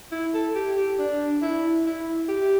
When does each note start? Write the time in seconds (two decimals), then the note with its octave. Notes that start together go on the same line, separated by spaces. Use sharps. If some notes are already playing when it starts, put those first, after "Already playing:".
0.12 E4
0.34 A4
0.55 G4
0.77 G4
0.99 D4
1.42 E4
1.86 E4
2.29 G4